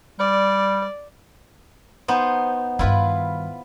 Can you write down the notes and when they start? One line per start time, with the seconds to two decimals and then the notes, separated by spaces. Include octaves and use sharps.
0.19 G3 D5
2.08 B3 D#4 C5
2.79 G2 D#3 E4 F4 B4